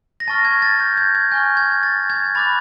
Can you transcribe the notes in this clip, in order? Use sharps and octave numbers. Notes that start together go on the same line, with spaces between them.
A#6
A5 C#6 F6 A6
G#6
A6
G6
G#6
G#6
G#5 C#6 F6 G6
G#6
A6
G#6
B5 D6 F#6 A6